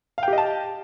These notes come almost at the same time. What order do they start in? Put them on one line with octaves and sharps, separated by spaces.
F5 G5 G4 D#5 A5